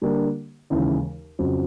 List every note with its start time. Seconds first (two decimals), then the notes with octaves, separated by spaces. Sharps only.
0.02 D3 G3 A#3 D4 G4
0.70 D#2 C#3 E3 G#3
1.39 F2 C#3 F#3